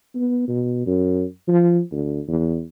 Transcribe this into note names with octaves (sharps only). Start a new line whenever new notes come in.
B3
B2
F#2
F3
D2
E2